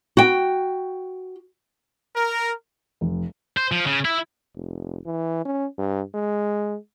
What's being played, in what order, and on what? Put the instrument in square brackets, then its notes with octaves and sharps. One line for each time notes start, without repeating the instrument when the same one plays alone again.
[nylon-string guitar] F#4 G5
[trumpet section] A#4
[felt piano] F1
[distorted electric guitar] C5
F3
C#3
E4
[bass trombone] F1
E3
C#4
G2
G#3